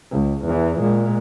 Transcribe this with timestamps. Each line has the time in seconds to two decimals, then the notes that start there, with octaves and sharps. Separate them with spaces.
0.12 C#2
0.45 E2 E3
0.80 A#2 G#3